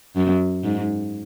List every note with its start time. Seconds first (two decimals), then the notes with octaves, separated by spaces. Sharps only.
0.16 F#2
0.64 G#2